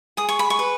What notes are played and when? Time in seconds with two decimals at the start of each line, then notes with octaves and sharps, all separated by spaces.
0.17 G#4 D#6
0.29 C#6
0.39 B5
0.50 C#6
0.59 B4